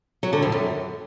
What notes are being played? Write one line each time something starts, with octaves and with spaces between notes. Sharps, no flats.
F#3
D3
F2
F#2